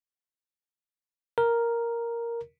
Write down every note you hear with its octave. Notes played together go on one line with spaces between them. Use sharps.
A#4